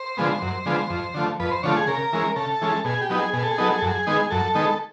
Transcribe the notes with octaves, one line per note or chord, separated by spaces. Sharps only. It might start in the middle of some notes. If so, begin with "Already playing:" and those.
Already playing: C5
D3 F3 G#3 B3
F#2
D3 F3 G#3 B3
F2
D3 F3 A3
F2 B4
C5
D3 F3 A3 C#5
G#4
C#3 A#4
E3 G#3 C#4
C#3 A4
E3 G#3 C#4
B2 G#4
G4
F#3 B3 D#4
G#4
B2 G#4
A4
G#4
F#3 B3 D#4 A4
G#4
F#2 A4
G#4
D#3 G#3 B3 D#4
F#2 A4
D#3 G#3 B3 D#4